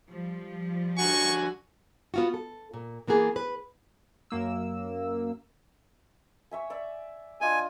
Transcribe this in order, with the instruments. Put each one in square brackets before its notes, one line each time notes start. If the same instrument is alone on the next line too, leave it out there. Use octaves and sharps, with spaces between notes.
[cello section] F3 G3
[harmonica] D3 F#4 G#5 [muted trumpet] C#6
[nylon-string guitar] B3 F4 F#4
A4
A#2
E3 A#3 B3 G#4
B4
[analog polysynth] F#2 A#3 E6
[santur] C#5 E5 G#5
D5 E5
[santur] D4 F4 D#5 [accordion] G#5